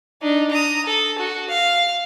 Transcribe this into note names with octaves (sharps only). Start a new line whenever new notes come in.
D4 D#4
A#5 D#6
A4
F#4
F5